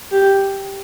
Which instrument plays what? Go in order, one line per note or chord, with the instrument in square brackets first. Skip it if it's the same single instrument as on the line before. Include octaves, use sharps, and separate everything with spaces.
[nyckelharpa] G4